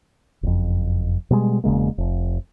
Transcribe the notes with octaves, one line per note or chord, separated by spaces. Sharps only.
F#1 F2
B2 G3 G#3
E1 C#3 G#3 A#3
F1